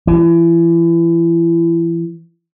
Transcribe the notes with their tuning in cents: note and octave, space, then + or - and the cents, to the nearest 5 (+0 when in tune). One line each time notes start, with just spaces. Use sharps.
E3 +30